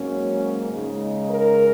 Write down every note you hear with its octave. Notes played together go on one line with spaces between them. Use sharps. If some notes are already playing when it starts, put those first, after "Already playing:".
Already playing: G#2 F#3 A#3 C#4
C#3 G#3 D#4
A#4